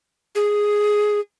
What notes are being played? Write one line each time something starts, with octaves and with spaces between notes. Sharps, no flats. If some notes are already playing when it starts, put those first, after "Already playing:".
G#4